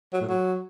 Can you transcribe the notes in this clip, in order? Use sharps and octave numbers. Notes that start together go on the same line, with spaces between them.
F#3
A2
F#3